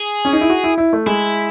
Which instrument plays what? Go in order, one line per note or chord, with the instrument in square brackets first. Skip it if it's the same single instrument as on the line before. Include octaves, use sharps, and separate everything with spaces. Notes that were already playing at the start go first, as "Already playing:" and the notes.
Already playing: [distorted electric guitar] G#4
[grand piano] C#4
D#4
E4
F#4
E4
E4
A3
[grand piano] G#3 [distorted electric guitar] E4